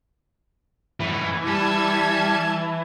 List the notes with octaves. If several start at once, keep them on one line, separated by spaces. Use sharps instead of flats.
F#2 A2 E3
G3 A5 G#6